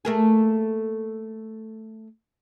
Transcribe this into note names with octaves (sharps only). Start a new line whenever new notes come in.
A3 A#3 G#4